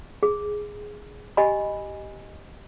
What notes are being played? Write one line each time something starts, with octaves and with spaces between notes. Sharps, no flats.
G#4
G4 D#5 G#5 B5